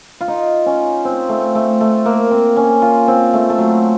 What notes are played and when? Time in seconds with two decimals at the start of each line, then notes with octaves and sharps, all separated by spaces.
0.21 F4
0.28 D#4
0.66 C#4
1.05 C4
1.29 A3
1.55 A3
1.81 A3
2.06 A#3
2.31 C4
2.56 C#4
2.82 F4
3.08 C4
3.33 A3
3.50 A3
3.58 F#3